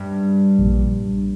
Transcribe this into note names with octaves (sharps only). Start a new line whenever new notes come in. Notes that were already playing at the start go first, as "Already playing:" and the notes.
Already playing: G2
A#1 A#2 G3